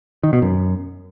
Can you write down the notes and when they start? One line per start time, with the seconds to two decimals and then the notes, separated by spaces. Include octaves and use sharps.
0.23 D#3
0.33 B2
0.42 F#2